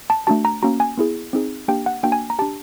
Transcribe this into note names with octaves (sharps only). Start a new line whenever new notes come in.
A5
A3 D4 F#4 A5
A#5
A#3 C#4 F#4 A#5
G#5
B3 E4 G#4
C4 D#4 G#4
A#3 D4 G4 G5
F#5
A#3 D4 F#4 G5
G#5
A#5
D4 G4 A5